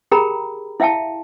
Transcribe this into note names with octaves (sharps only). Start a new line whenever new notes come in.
G4 G#4 A#4 G5 A#5 B5
E4 E5 F5 G5 A5